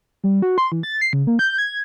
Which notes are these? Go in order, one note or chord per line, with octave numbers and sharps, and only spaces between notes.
G3
F#4
C6
E3
A6
C7
C#3
A#3
G6
G#6